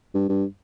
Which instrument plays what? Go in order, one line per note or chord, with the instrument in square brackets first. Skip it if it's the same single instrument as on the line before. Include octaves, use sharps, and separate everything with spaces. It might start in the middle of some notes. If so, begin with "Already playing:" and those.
[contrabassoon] G2
G2